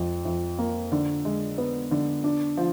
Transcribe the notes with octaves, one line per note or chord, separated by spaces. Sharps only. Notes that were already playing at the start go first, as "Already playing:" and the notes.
Already playing: F2
F2
A#3
D3
G#3
B3
D3
D4
F3